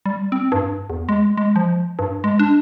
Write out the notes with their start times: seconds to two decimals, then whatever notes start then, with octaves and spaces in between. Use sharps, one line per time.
0.06 G3
0.32 C4
0.52 G2
0.90 E2
1.09 G#3
1.37 G#3
1.56 F3
1.99 G2
2.24 G#3
2.39 D4